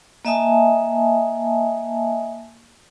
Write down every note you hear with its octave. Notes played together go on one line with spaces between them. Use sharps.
A#3 D#5 E5 G#5 A5 D#6